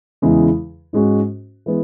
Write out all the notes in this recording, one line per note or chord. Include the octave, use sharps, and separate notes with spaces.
E2 C#3 E3 G#3
G#2 G#3 C#4 F#4
E3 G#3 B3